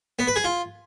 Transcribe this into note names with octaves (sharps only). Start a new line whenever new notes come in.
B3
B4
G#4
F4